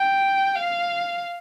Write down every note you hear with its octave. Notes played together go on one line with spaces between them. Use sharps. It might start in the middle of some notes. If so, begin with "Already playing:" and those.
Already playing: G5
F5